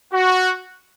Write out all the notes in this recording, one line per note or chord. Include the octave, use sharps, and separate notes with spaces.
F#4